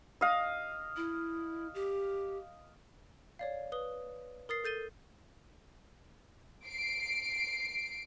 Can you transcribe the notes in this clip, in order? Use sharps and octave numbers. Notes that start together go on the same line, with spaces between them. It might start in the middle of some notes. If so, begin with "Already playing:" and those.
D#5 F5
E4
G4
C#5 D5 F5
B4 D#6 G7
A#4 D#6 A6 C7
A4 G6 A6 D#7 G7
C7 D7